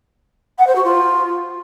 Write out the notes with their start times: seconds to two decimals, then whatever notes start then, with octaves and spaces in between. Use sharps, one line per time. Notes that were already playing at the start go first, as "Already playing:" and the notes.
0.58 F#5
0.67 C5
0.75 F#4
0.84 F4